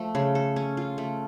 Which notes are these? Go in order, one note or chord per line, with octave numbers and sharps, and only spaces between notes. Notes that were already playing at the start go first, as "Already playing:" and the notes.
Already playing: F3 A3
C#3
A4
C#4
F4
A3